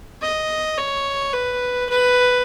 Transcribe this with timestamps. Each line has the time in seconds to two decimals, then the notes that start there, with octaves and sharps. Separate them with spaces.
0.22 D#5
0.78 C#5
1.33 B4
1.89 B4